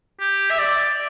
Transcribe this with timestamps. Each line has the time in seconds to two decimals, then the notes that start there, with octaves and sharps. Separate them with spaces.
0.20 G4
0.51 E5
0.59 D5